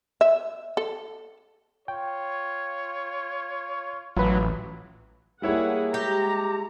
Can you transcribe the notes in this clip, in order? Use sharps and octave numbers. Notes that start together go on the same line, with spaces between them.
E5
A4
F4 C#5 G5
A1 F#3 F4 B4 E5 B5
G3 A#3 E4 G#4 C#5 F#5
G#3 G4 A#5